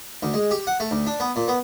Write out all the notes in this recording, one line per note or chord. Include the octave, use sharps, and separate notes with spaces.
D2
G#3
G4
F#5
A3
D2
D4
B3
A#2
B3